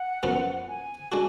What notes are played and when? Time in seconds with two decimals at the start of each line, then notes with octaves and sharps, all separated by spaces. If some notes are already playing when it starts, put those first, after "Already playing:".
Already playing: F#5
0.23 F#2 F3 B3 F4
0.68 G#5
1.12 G#3 D4 F#4